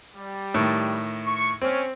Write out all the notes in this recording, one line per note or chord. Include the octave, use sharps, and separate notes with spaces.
G3
A2 D#3
C#6
C4 C#4